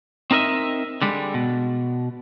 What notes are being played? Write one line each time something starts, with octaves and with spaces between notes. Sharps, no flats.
C4 D#4 A#4 D#5 E5
D3 G3 G#3
B2